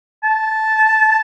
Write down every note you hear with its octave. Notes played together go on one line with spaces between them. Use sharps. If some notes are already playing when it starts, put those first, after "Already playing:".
A5